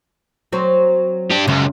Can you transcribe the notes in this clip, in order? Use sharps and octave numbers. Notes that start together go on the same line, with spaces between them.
F#3 C4
D4 G4
C#2 F#2